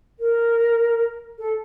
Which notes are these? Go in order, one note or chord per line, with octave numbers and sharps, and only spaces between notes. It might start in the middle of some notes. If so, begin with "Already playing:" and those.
A#4
A4